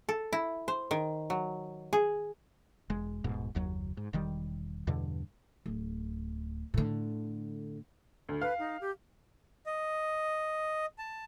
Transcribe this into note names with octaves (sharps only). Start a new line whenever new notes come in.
A4
E4
C5
D#3
F#3
G#4
E1 G#3
D#1 G#2 B2
F#1 D#2 F#3
G#2
E1 D#3 G3
E2 G2 B2 D3
D1
A2 D3
D2
B4 F5
D#4
G4
D#5
A5